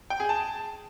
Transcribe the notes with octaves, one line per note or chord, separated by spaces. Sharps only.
G5
G#4
A5